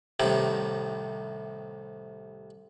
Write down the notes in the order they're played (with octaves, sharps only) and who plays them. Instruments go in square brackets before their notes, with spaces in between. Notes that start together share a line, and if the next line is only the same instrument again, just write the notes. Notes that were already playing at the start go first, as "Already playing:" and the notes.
[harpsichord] C2 A2 C3 D#3